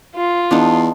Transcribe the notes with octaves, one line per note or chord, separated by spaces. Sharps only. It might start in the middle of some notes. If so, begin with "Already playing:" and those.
F4
E2 D4 D#4